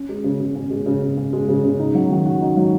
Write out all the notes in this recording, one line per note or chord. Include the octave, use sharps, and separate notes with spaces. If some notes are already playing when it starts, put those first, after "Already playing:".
Already playing: C#4
G#3
C#3
C#3
C#4
G#3
C#3
C#3
C#4
G#3
C#3
C#3
D#4
F#3
D#3
F#4
D#4
F#3